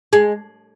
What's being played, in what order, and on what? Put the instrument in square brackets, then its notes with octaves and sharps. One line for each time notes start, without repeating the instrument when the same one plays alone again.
[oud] G#3